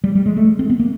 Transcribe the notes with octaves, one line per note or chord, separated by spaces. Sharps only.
G3
G3
G#3
A3
C4
B3
A#3